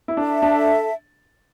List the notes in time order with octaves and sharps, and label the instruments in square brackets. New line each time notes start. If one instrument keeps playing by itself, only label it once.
[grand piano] E4
[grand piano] D4 [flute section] A4 E5 A5
[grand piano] D4